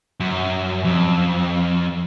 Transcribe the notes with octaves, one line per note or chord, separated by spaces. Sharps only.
F#2
F2